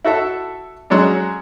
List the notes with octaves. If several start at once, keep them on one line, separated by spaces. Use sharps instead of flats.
E4 F#4 A4 E5
F#3 G#3 C#4 D4